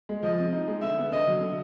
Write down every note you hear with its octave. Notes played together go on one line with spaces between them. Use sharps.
G#3
F3 D#5
C4
D#4
G#3
D3 E5
B3
D3 D#5
F#3
D3